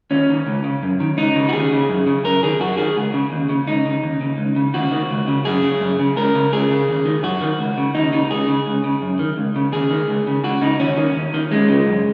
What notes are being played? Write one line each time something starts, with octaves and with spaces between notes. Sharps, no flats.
D#2 C#4
D#3
C#2
C#3
F#2
D#3
C#2 D#4
C#3
F#4
D#2 G#4
C#3
F#2
C#3
F#2 A#4
D#3 G#4
F#2 F#4
D#3 G#4
C#2
C#3
D#2
C#3
C#2 D#4
C#3
D#2
C#3
C#2
C#3
D#2 F#4
D#3
C#2
C#3
F#2 G#4
C#3
F#2
C#3
C#2 A#4
C#3
C#2 G#4
C#3
D#2
D#3
F#2 F#4
D#3
C#2
C#3
D#2 D#4
C#3 D#4
C#2 G#4
C#3
C#2
C#3
F#2
D#3
C#2
C#3
D#2 G#4
D#3
C#2
C#3
C#2 F#4
C#3 D#4
D#2 C#4
D#3
D#2
D#3
D#2 G#3
C#3
F#2